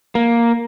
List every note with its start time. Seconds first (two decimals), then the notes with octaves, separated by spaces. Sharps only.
0.15 A#3